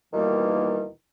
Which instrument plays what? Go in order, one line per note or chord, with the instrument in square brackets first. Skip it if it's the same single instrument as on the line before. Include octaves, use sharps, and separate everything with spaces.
[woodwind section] D#2 B2 D#3 E3 G3 A#3